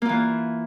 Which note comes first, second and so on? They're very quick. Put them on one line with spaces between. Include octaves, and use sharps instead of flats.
A#3 F4 E3